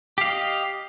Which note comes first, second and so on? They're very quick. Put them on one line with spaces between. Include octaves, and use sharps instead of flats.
G4 F5 D#5